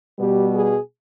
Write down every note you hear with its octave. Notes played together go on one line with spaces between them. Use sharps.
B2 G3 B3 G4
G#4